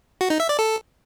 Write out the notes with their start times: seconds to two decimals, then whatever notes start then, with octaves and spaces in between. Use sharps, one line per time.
0.21 F#4
0.30 D#4
0.40 E5
0.49 D5
0.59 A4